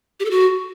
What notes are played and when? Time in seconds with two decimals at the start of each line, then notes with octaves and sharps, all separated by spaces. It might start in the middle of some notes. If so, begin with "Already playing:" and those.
0.20 G4
0.25 A4
0.31 F#4